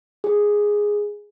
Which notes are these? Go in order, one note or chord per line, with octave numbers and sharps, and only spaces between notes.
G#4